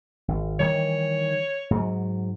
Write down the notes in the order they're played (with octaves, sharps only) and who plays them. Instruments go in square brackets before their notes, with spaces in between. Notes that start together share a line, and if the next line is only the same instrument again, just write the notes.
[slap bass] G#1
[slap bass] D#3 E3 G3 [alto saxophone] C#5
[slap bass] G#2 F#3